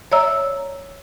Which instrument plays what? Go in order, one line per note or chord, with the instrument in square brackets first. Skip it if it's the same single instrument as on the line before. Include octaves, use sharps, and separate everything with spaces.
[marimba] C#5 D5 E5 A#5 E6